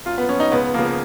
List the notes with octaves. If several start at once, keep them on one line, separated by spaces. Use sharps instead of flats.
F#2 F4
B3
F3 C#4
D#4
C#2 B3
C#3 F3 A#3